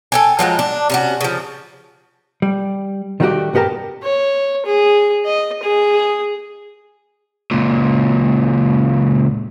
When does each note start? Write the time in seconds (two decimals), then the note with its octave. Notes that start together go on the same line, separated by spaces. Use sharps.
0.12 A4 G5 G#5
0.39 F3 F#3 G#3 F4
0.59 D4
0.90 C3 C#4 F#4
1.21 C#3 F3
2.42 G3
3.20 D#3 G3 A3 D#4 F#4 G4
3.53 B1 G2 B3 G4 A#4 A5
4.03 C#5
4.66 G#4
5.26 D#5
5.63 G#4
7.51 C#2 A#2